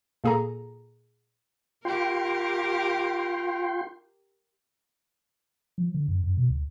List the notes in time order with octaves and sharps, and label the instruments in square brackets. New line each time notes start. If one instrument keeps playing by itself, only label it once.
[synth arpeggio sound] A#2 A#3 G#4 A4 A#5
[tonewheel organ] F4 G5 C6 [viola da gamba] G4 A#4
[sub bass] F3
D3
F#2
F#2
B2
D2